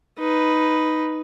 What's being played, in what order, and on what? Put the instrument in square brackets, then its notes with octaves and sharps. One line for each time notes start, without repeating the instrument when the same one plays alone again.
[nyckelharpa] D#4 B4